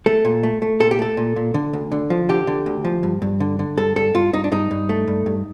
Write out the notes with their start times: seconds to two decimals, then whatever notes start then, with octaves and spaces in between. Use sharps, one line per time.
0.06 A3 A4
0.25 A#2
0.43 A3
0.62 A3
0.80 A#2 A4
0.91 G4
0.99 A3 A4
1.17 A#2
1.36 A#2
1.54 D3
1.73 D2
1.92 D3
2.10 F3
2.29 D3 G4
2.47 D3
2.66 D2
2.85 F3
3.03 G2
3.22 G2
3.40 D3
3.59 D3
3.77 G2 A4
3.96 G2 A4
4.14 G2 F4
4.33 G2 D#4
4.44 D4
4.52 G2 D#4
4.71 G2
4.89 A3
5.08 G2
5.26 G2